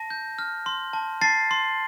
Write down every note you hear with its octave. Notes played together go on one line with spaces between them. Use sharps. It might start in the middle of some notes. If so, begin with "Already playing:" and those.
Already playing: A5 A#6
G6
F6
C6
A5
A5 A6 C7
C6